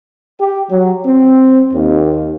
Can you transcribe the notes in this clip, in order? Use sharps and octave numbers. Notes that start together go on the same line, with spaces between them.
G4
F#3
C4
D#2